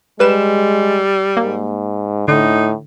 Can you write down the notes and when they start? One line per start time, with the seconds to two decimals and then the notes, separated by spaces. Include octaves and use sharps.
0.20 G3 G#3 B4 E7
1.37 G#2 A#3
2.28 A2 D3 D#4